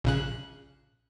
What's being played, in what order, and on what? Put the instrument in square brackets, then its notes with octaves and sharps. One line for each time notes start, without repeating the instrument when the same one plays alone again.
[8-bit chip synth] A#1 C#3 F#6